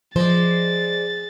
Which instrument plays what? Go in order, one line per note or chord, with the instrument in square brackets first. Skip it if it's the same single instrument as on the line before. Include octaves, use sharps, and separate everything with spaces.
[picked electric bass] F3 [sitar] G#3 [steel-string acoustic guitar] C5 D5 [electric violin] A6